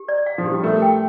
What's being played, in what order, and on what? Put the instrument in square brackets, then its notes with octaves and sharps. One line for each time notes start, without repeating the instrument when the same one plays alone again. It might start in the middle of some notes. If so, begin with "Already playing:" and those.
Already playing: [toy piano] G4
D5
F5
[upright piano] F3
[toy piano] G4
[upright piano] G3
[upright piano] A3 [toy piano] A#4
[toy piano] G5